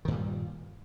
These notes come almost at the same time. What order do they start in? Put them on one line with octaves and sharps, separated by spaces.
D#3 G2 A#2 G3